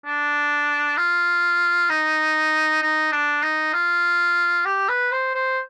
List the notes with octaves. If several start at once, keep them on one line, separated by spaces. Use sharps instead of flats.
D4
F4
D#4
D#4
D4
D#4
F4
G4
B4
C5
C5